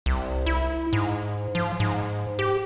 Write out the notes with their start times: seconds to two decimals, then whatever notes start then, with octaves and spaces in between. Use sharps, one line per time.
0.06 C2
0.46 E4
0.93 G#2
1.55 F3
1.80 G#2
2.39 G4